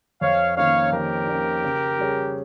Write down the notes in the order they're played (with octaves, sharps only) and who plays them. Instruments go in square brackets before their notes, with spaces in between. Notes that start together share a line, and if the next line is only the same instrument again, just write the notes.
[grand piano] F2 [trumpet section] C#5 F5
[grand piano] D#3 A#3 C#4 [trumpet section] C#5 F5
[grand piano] F2 [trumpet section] G4 A#4
[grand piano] D#3 A#3 C#4
C#3
G3 C#4 G#4